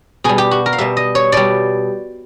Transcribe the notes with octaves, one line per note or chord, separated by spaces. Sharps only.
B2 G3 G#4
G4
F#4
A#4
F5
B2 G3 E5
D#5
C#5
B2 G3 D5